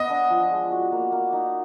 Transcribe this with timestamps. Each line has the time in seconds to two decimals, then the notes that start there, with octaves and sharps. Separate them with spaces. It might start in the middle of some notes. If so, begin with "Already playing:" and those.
Already playing: B3 D#5
0.10 D4
0.30 F3
0.51 G#3
0.72 F#4
0.92 A#3
1.12 A#3
1.33 D#4